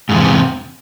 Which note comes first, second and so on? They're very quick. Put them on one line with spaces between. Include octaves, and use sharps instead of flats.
G#2 E2 C3